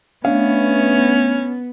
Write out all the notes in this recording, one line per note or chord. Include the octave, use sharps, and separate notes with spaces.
A3 B3 C#4 D4 F5